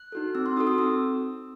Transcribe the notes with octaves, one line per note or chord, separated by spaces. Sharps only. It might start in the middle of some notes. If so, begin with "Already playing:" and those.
Already playing: F#6
D#4 F#4 A4
C4 E6
C6
D#4 F#4 A4 D#6
D#6
C4 E6